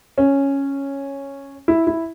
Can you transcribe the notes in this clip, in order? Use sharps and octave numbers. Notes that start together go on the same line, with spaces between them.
C#4
E4
E4